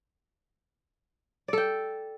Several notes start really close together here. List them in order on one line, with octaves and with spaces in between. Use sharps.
D5 A4 G5